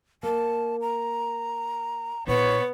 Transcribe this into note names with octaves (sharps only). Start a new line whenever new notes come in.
A#3 A5
A#5
A#2 B3 E4 C#5